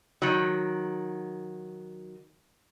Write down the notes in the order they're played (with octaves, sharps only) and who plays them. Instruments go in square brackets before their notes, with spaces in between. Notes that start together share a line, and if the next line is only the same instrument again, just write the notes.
[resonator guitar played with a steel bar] D#3 F#3